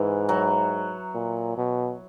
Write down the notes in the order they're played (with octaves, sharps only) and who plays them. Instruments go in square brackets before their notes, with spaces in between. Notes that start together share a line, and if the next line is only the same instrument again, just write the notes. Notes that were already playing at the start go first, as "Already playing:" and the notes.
Already playing: [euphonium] G#2 [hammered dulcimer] E3
[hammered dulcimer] F#3
[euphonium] A#2
B2